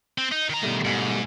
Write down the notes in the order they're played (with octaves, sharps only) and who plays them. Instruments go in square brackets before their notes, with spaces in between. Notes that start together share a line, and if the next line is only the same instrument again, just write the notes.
[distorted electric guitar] C4
D#4
D#3 A#5
[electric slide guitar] B2 G3 A3
[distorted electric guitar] G#2